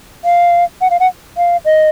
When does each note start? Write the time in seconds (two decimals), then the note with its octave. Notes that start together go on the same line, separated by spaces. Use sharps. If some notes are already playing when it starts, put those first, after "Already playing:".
0.25 F5
0.81 F#5
0.90 F5
1.00 F#5
1.37 F5
1.65 D#5